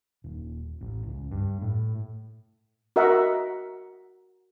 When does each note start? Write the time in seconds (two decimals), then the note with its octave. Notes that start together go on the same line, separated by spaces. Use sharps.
0.24 D#1
0.81 A1
1.07 C#2
1.31 G2
1.62 A2
2.96 F#4 A#4 D#5 E5 F#5